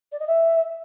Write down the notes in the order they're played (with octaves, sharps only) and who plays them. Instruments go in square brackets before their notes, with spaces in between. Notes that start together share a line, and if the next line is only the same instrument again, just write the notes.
[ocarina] D5
D#5
E5